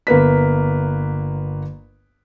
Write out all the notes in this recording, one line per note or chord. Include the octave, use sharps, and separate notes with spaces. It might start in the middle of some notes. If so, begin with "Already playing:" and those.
G1 A#3 B4 B6